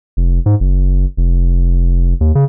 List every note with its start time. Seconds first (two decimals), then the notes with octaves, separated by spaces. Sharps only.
0.17 F1
0.46 G#2
0.60 F#1
1.17 F1
2.21 D#2
2.35 C#3